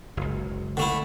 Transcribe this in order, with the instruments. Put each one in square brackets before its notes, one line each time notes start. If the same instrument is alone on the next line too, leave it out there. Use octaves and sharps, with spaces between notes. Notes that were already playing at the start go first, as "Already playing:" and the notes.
[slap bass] F#1 C#2
[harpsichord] D3 A3 E4